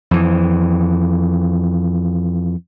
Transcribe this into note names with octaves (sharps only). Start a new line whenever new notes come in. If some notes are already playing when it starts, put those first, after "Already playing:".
F2 E3